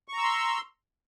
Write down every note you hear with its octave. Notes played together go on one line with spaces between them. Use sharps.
A#5 C6 C#6 E6